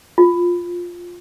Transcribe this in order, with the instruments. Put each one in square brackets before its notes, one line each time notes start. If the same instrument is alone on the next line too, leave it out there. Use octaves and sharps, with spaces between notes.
[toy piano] F4